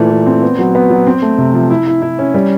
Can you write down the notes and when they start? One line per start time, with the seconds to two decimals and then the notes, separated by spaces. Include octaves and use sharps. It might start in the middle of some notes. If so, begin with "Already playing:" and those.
Already playing: A#2 E3 A3
0.10 E3
0.26 C4
0.42 B3
0.59 F#3
0.75 B3
0.90 F#3
1.07 C4
1.22 A3
1.38 C3
1.54 F3
1.70 E4
1.87 E4
2.02 E4
2.19 C#4
2.34 G3